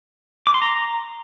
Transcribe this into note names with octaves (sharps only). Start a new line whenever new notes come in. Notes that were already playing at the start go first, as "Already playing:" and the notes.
D6
C6
A#5